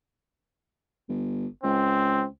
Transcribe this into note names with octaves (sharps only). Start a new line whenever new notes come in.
G1
C#2 C4